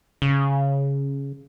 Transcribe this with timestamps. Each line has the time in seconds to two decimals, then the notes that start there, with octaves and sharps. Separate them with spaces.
0.22 C#3